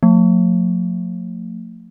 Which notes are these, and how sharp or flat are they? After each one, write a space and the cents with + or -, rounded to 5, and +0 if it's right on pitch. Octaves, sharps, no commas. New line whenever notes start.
F3 +45 A3 +45